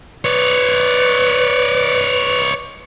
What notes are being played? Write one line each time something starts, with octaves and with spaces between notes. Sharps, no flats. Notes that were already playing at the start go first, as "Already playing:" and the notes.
B4 C#5 D5